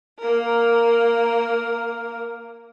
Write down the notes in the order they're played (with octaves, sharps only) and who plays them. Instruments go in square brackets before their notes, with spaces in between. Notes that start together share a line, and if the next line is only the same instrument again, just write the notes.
[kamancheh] A#3 A#4